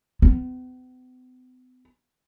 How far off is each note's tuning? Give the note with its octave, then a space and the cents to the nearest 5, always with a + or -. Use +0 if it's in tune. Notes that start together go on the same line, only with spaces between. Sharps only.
B3 +45